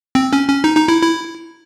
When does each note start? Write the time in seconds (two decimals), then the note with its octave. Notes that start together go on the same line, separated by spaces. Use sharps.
0.15 C4
0.33 C#4
0.48 C#4
0.64 D#4
0.77 D#4
0.88 E4
1.02 E4